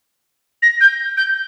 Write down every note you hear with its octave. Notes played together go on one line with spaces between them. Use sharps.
A#6
G6
G6